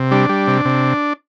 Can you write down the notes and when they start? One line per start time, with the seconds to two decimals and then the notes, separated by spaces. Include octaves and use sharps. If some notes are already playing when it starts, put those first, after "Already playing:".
Already playing: C3
0.11 G3 D4
0.29 G3
0.48 C3
0.65 C3